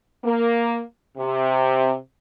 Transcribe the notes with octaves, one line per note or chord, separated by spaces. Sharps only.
A#3
C3